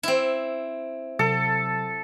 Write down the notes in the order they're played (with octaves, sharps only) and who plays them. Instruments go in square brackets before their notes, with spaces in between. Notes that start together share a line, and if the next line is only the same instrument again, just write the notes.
[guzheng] C4 E4
[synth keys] C3 F#3 [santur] A4